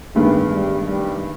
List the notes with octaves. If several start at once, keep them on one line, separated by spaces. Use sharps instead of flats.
A1 G2 D#3 G3 G#3 B3
G3
G3